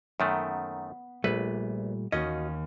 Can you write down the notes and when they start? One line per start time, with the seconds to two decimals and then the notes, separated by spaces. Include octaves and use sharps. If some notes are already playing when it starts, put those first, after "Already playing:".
0.20 F#2 D#3 A3 B3
1.24 A#1 A#2 G3 A3 B4
2.12 D#2 C#4 F#4 D#5